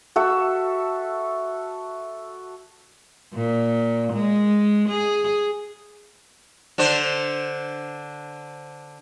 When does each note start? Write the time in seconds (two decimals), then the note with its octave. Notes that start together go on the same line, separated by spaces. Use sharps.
0.16 F#4 A4 E5
3.34 A#2
4.13 G#3
4.89 G#4
6.78 D3 D4 C5